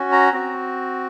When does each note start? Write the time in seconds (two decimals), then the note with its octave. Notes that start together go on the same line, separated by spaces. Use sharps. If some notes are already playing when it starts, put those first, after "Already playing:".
Already playing: C#4 F#4
0.12 A#5
0.32 C4 F#4